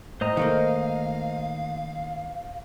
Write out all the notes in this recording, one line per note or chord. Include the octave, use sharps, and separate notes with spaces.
A2 C5 D#5 A#5
D#3 A3 A#3 F5